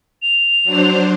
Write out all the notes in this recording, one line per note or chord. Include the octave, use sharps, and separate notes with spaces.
F7
F#3 D4 C5